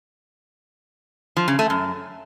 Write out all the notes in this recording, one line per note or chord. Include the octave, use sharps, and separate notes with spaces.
F3
C#3
A3
F#2